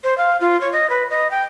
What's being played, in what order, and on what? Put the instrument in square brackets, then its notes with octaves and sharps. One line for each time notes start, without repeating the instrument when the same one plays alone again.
[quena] C5
F5
F4
C#5
D#5
B4
D#5
G5